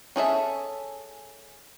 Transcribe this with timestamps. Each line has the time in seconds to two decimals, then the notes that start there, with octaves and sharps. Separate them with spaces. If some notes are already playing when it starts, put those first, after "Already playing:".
0.16 C#4 G#4 A4 E5